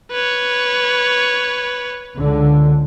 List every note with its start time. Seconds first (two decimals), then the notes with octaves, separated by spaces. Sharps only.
0.11 B4 C#5
2.17 C#2 D3